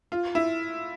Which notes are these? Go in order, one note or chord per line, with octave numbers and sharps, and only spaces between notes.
F4
E4